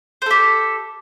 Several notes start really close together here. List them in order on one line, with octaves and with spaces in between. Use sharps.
C5 A4 G4